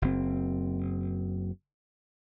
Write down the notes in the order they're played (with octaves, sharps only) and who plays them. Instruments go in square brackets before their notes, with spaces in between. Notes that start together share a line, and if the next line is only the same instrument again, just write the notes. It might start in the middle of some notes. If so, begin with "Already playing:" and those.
[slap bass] F#1 C4